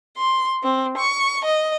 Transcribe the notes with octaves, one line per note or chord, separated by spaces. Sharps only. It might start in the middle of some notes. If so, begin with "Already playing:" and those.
C6
C4
C#6
D#5